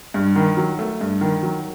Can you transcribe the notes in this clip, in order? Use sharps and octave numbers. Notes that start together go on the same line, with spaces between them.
G2
D#3
F#3
A3
G2
D#3
F#3